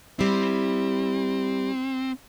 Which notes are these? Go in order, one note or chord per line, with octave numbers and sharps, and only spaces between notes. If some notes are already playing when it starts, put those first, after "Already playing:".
G3 C4 E4